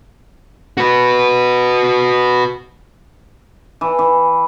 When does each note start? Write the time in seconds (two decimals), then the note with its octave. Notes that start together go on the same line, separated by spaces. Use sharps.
0.77 F#4 B4
3.81 E3
3.99 E3